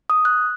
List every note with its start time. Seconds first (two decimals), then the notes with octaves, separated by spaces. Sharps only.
0.10 D#6
0.25 F#6